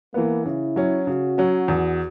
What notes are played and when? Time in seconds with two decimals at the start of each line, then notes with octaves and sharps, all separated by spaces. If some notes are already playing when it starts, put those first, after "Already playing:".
0.14 E3 A#3 B3
0.45 C#3 E4
0.76 F#3 C#4
1.07 C#3 F#4
1.38 F#3 C#4
1.68 E2